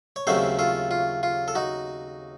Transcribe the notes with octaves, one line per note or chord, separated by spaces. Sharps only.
C#5
D#2 C#3 F#3 A3 C4 A4 C5
F4 A4
F4
F4
A4
D#4 F#4